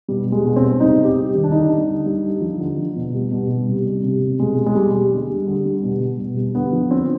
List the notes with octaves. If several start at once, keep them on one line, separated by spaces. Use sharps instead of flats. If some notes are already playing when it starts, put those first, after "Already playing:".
B2 G3
G3
G#3
B2
C4
G3
C3 D#4
C3
G4
G3
D#3
D4
D3 D#4
G3
D3
G3
D3
F3
D3
F3
B2
G3
B2
G3
C3
G3
C3
G3
B2 G#3
G3
G#3
B2 G3
G3
D3
G3
D3
G3
B2
G3
B2
G3
D3 B3
F3
D3 C4